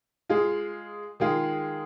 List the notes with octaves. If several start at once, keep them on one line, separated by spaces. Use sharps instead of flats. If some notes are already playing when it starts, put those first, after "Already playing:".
G#3 F4 G#4
D#3 G#3 F4 G#4